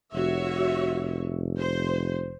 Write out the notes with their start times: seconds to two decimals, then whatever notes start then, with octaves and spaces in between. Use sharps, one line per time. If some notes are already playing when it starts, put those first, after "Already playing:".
0.14 F1 F#4 C#5 E5
1.59 C5